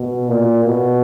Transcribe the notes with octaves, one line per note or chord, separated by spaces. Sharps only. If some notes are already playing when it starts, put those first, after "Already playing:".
Already playing: B2
A#2
B2